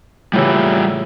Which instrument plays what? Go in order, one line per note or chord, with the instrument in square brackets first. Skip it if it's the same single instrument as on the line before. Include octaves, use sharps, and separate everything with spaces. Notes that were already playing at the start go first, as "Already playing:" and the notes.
[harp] A2 C#3 E3 [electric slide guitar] G3 F4 G4